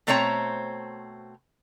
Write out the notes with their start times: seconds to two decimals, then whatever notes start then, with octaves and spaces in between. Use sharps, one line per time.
0.07 B2 A3 C4 C5 C#5 A#5